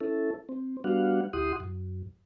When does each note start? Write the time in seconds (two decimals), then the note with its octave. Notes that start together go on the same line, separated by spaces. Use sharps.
0.01 C#4 E4 A4
0.49 C4
0.84 G3 B3 D4 F#4 F5 F#5
1.33 D2 E4 G4 F#5 C6 D#6
1.60 F#2